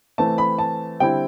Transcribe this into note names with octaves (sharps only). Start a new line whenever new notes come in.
E3 A3 C4 A5
B5
A5
D3 G3 C4 E4 G5